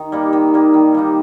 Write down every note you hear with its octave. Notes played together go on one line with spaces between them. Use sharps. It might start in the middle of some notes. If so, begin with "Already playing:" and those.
Already playing: D#3
G3 A#3 D#4
D#3
G3 A#3 D#4
D#3
G3 A#3 D#4